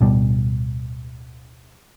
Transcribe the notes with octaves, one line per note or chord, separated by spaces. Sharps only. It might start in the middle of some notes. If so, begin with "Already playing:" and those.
D1 B2 G3